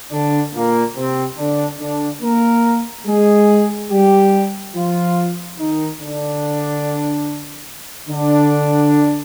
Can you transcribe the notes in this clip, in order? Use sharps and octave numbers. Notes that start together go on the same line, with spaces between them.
D3 D4
A#2 A#3
C3 C4
D3 D4
D3 D4
A#3 A#4
G#3 G#4
G3 G4
F3 F4
D#3 D#4
D3 D4
D3 D4